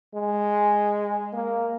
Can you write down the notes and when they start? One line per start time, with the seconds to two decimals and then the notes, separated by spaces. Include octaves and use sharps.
0.14 G#3
1.33 A#3